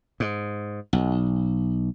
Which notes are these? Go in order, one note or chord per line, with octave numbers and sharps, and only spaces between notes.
G#2
B1